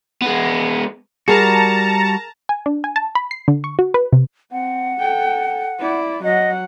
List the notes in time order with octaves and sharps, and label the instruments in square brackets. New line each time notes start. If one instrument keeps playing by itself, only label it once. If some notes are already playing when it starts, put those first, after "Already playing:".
[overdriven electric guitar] G#3 B3
[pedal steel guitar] G3 F#4 [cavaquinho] G#4 A#4 [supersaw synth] A5 A#5
[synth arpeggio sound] G#5
D4
G#5
A5
B5
C7
D3
C#6
F#4
B4
C3
[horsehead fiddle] C4 [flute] F#5
[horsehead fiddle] A4 G5
E4 D5
[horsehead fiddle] F#3 F#5 [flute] D#5